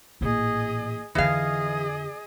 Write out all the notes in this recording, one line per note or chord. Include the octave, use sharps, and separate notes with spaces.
A1 A#2 G#4 D#5
F2 D3 E3 G#4 D#5 F5